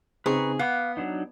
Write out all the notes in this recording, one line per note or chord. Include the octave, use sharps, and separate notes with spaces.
C#3 C4 D#4 G#4 B4 A#5 C#6
B3 F5 F#5 D6 F#6
F#3 D4 D#4